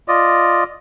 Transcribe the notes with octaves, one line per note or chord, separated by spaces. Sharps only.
F4 D5 D#5